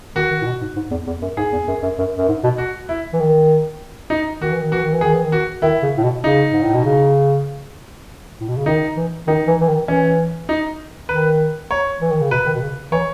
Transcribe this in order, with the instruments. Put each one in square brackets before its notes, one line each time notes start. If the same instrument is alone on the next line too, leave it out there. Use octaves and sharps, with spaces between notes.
[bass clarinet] D#3 [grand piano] F#4
[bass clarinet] D#3
A2
B2
G#2
G#2
E2
E2
F#2
[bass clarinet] G#2 [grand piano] G#4
[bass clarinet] E2
F#2
F#2
F#2
F#2
G#2
B2
[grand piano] F#4
E4
[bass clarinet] E3
D#3
[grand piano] D#4
[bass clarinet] D#3 [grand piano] F#4
[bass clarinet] E3
D#3
[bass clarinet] E3 [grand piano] F#4
[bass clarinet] D#3
E3
[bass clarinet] D#3 [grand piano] G#4
[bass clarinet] E3
D#3
[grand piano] F#4
[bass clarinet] D#3 [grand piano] E4
[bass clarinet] C#3
A2
B2
[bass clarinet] C#3 [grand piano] D#4
[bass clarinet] G#2
A2
B2
C#3
A2
B2
C#3
[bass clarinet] D#3 [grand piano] D#4
[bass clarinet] E3
[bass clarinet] D#3 [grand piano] D#4
[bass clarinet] E3
E3
D#3
[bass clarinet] E3 [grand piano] C#4
[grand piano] D#4
[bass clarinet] D#3 [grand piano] B4
[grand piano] C#5
[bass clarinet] E3
D#3
C#3
[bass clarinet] B2 [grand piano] B4
[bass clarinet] D#3
B2
C#3
[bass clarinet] E3 [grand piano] C#5